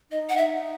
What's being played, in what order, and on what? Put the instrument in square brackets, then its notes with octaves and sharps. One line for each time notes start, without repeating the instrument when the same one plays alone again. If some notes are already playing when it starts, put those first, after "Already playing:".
[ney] D#4 [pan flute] D#5
[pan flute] F#5
[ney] D#4 [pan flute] E5